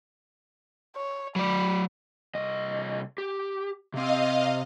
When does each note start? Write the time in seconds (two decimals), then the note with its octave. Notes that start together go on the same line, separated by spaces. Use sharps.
0.96 C#5
1.36 F#3 D5 B5
2.35 C2 D#5
3.18 G4
3.94 C3 C4 D#5 F5